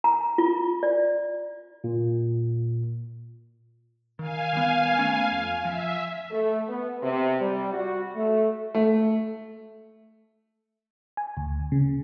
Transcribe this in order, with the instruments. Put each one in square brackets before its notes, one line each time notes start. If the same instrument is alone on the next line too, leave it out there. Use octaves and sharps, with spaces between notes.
[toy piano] A#5
F4
D5
[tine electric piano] A#2
[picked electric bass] D#3 [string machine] F5 G#5
[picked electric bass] D#3 G3 B3
A3 B3 C#4
F2
[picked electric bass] F3 [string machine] E5
[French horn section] A3
B3
C3
G3
F#4
A3
[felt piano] A3
[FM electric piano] G#5
D2
C#3